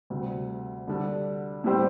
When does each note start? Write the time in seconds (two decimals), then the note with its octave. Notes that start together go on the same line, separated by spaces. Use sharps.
0.10 D2 C3 G3
0.87 D3 G3 D4
1.64 A2 G3 C4 G4 C5